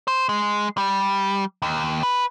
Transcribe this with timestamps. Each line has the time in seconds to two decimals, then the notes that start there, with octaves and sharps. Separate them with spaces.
0.08 C5
0.29 G#3
0.78 G3
1.62 D#2
2.03 B4